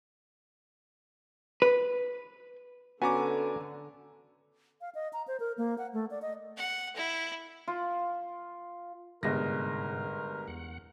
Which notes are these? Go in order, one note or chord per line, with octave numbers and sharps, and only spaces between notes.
B4
D3 B3 C#4 F#4 G#5 A#5 D6
F5
D#5
A#5
C5
A#4
A#3
F#5
A3
D5
D#5
F#5
E4
F4
G1 G#2 C3 G#3 A#4 A#6
E2 F#5